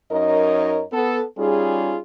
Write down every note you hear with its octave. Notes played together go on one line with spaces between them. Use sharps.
F#2 D#4 A#4 C#5 D#5
B3 A4
G3 C#4 D#4 F4 G#4